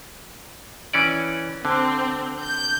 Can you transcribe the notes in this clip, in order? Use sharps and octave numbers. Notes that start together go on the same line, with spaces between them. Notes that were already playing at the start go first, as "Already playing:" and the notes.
E3 C#4 D5
D3 C4
G6